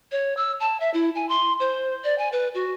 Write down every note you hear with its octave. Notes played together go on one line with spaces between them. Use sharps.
C#5
E6
A5
E5
E4
G#5
C6
C5
D5
G#5
B4
F#4